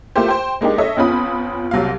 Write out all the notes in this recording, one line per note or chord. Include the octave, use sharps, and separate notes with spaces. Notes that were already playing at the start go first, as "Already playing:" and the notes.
A3 A#3 E4 F4 G4 C5
C5 G5
G#3 A#3 D4 D#4 G4
A4 C#5 D#5 E5
E2 C4 C#4 F4 B5 D#6
C2 F#3 C4 F5